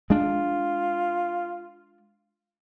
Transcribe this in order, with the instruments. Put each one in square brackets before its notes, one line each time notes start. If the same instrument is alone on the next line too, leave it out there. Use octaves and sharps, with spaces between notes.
[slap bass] G#3 D4 [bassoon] F4